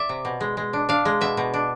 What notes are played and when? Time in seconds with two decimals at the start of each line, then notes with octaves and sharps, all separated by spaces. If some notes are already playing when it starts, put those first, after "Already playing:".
Already playing: D5 E5
0.09 C3
0.25 B2
0.41 G#3
0.57 G#3
0.73 D4
0.89 D4 F5
1.05 G#3
1.21 B2 E5
1.37 B2
1.54 D4